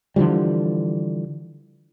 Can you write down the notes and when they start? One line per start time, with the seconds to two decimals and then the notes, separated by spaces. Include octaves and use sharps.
0.16 D3 E3 F3 G3